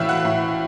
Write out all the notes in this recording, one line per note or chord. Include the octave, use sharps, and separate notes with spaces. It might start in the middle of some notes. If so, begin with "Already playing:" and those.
Already playing: A2 E3 E5 F5 E6 F6
F#5 F#6
A2